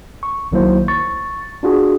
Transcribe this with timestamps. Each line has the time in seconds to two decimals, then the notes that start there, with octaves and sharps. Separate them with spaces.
0.23 C#6
0.52 B1 D#3 F#3 A#3 E4 C5
0.88 C#6 A6
1.63 D4 F4 F#4 G#4